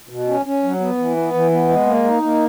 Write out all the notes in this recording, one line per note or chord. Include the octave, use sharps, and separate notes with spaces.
B2
C#4
C#4
F#3
B3
E3
B3
E3
B3
G#3
A#3
D#4
A#3